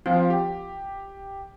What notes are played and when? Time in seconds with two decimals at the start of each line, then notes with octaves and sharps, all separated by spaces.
0.06 F3 C4 F4
0.30 G4